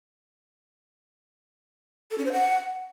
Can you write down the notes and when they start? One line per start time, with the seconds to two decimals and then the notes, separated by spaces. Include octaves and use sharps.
2.11 A4
2.18 C#4
2.25 C5
2.32 F#5